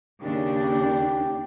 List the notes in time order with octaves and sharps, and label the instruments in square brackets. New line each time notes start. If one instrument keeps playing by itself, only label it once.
[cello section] D#2 C#3 D4 [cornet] G4